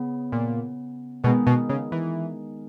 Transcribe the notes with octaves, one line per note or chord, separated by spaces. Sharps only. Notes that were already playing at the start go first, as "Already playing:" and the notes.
Already playing: C#3 B3
A#2
B2 D#3 G#3 B3
B2
C#3
E3